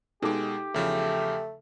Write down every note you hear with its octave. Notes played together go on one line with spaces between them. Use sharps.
B2 G#3 D#4 G4 A4 D6
E2 C#3 F3 A3